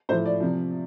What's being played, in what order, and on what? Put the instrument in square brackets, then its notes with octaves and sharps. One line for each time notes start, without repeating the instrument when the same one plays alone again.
[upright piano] A2 C5
F3
D5
C3 F3